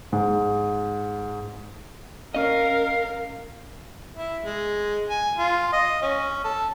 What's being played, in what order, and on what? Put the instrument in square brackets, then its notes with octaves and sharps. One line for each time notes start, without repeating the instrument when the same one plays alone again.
[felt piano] G#2
[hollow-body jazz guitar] C#4 D#5 [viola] A#4 [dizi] F5
[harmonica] E4
G#3
G#5
F4
D#5
C#4
A4